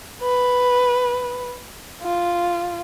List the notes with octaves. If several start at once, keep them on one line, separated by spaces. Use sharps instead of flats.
B4
F4